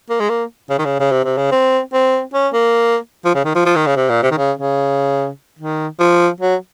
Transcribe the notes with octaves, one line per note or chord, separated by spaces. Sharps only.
A#3
G#3
A#3
C#3
D#3
C#3
C#3
C3
C3
C#3
C4
C4
C#4
A#3
F3
C#3
D#3
F3
F3
D#3
C#3
C3
A#2
C3
D#3
C#3
C#3
D#3
F3
F#3